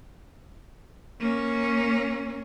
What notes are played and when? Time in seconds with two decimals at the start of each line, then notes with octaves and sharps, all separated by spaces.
1.20 A#3 C#4